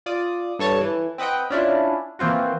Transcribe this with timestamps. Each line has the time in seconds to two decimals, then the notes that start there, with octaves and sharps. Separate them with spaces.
0.06 F4 D5 D#6
0.59 G2 A4 C#5 A5
0.81 E3
1.18 C4 B4 D#5 F#5 G5
1.50 C#4 D4 E4 F4
2.19 E3 A#3 C4 F4 F#4